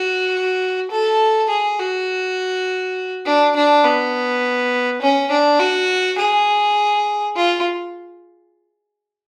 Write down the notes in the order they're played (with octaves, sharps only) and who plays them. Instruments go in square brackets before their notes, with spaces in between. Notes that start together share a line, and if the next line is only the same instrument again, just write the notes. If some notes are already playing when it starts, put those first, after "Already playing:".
Already playing: [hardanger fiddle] F#4
A4
G#4
F#4
D4
D4
B3
C#4
D4
F#4
G#4
F4